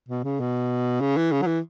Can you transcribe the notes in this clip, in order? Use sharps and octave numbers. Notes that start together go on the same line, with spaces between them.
B2
C#3
B2
C#3
E3
C#3
F#3
E3